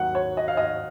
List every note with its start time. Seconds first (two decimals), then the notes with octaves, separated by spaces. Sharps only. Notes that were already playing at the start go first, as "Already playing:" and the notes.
Already playing: D#2 D#3 F#3 F#5
0.15 C#5
0.37 D#5
0.48 F5
0.57 D#5